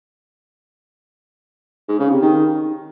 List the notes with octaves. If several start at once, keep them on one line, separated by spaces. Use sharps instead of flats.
G#2
C#3
C3
D#3